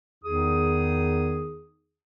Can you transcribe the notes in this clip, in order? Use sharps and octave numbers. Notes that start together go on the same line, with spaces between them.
E2 D#3 D#4 G#4 D#6